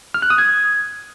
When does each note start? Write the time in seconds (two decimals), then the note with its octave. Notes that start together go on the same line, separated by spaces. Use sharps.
0.14 F6
0.22 F#6
0.30 D#6
0.38 G#6